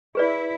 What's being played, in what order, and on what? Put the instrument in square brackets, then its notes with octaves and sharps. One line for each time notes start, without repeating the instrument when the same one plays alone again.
[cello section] E4 [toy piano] G#4 B4 D5